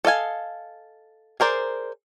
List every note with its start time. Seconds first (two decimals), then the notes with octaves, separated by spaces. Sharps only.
0.05 A4 D#5 F5 G#5
1.40 G#4 A#4 C5 D5